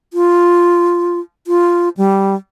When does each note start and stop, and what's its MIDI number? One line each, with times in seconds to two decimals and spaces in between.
0.13 1.20 65
1.47 1.89 65
1.97 2.35 55